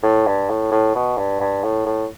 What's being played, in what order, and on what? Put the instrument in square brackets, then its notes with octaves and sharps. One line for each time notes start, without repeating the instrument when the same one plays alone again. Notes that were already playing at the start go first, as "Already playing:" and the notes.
[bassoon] A2
G2
A2
A2
B2
G2
G2
A2
A2